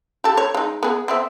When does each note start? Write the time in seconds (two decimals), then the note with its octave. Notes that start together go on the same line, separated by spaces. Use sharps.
0.24 G4 A4
0.37 C#5
0.55 G#3 D#4
0.83 B3 G#4
1.08 B3 C4 E5